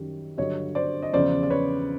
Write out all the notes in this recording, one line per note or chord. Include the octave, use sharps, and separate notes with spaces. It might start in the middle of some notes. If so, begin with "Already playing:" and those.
Already playing: F#2 D#3 G3
G2 D3 F#3 C#5 D#5
C5 D5
D#5
E2 C#3 F3 C5 D5
D5
B4 C#5